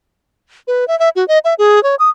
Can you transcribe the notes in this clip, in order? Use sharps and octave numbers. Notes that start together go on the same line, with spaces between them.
B4
E5
E5
F#4
D#5
E5
G#4
C#5
D#6